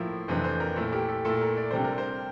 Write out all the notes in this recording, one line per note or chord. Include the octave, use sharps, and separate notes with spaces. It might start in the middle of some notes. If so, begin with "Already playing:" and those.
Already playing: A2 F3 A#3 E4
F2 C3 E3 A3 D4 C5
C5
A#4
A#2 A3 E4 A4
G4
A4
A#2 A3 E4 A4
A#4
D5
C3 G3 D4 C5
A#4
C5